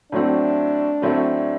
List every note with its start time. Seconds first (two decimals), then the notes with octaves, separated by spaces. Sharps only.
0.12 A2 F#3 A3 C4 D4
1.02 A2 F#3 A3 C4